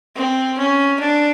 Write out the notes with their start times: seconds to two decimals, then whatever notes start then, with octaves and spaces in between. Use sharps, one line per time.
0.16 C4
0.58 C#4
1.00 D4